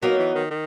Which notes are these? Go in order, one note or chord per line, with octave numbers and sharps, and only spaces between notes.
F#3 A#3 B3 D#4 A#4
E3
D#3
D#3